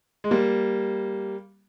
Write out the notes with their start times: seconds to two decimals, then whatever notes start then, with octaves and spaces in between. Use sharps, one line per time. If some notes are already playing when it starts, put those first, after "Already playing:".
0.24 G#3
0.31 G3 A#3